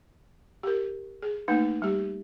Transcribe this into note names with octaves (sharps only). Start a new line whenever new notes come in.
G4 A#4
G#4
A3 A#3 D#4 B4
G3 G4